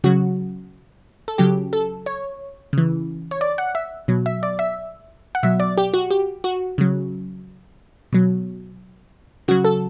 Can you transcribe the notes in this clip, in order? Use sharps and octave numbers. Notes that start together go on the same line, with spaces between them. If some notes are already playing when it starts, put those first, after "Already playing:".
C#3 F#3 F#4
A4
C#3 F#3 G4
A4
C#5
C#3 E3
C#5
D5
F#5
E5
B2 F#3
E5
D5
E5
F#5
B2 F#3 E5
D5
G4
F#4
G4
F#4
C#3 F#3
B2 F#3
C#3 F#3 F#4
A4